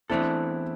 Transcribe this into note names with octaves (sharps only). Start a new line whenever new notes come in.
E2 E3 A3 C4 D4 E4 A4